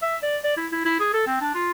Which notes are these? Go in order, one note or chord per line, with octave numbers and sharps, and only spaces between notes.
E5
D5
D5
E4
E4
E4
G#4
A4
C4
D4
F4